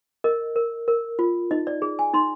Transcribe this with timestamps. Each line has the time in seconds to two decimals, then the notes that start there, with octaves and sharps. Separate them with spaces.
0.24 A#4 D#5
0.56 A#4
0.88 A#4
1.19 F4
1.51 D#4 D#5
1.67 D5
1.82 G#4
1.99 G#5
2.14 D#4 C6